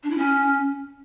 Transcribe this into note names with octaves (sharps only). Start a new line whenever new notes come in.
D4
E4
C#4